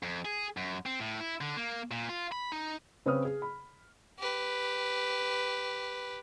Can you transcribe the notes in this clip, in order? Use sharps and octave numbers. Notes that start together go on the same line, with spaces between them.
F2
G#4
F#2
C4
A2
E4
D3
A#3
A#2
F4
B5
D#4
C#3 C4 B4 C#5 D#6 F6
G#4
B5
G4 B4